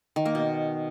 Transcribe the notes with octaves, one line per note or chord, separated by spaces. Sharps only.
D#3
A#3
B2